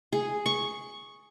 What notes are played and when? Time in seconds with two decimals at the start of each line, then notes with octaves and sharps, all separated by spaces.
0.13 G#4
0.46 C#6